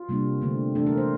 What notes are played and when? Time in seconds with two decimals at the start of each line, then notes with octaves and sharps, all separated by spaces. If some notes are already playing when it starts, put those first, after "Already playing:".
Already playing: F4
0.09 C3 G3 A#3 D4
0.41 D3 A3 C4
0.75 E3 A3 D4 A4
0.87 A#4
0.98 C5